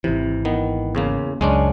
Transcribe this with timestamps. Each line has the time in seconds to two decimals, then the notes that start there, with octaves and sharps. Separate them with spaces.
0.04 G#1 C3 E3
0.45 D#3 B3
0.95 E2 C#3 A#3
1.41 C#2 F#2 C#3 G#3 C#4 D4